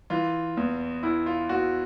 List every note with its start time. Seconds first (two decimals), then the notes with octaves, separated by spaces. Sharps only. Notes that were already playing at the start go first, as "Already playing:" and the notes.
0.10 E3 F4
0.57 E2
1.03 E2 E4
1.26 F4
1.49 E2 F#4